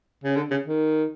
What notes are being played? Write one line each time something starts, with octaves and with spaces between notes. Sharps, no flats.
C#3
D3
C#3
D#3